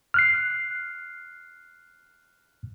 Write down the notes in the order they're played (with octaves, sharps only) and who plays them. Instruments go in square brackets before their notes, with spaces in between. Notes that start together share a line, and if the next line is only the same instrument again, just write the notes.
[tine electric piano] F6 F#6 C7